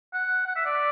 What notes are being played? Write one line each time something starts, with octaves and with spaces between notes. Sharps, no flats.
F#5
F#5
E5
D5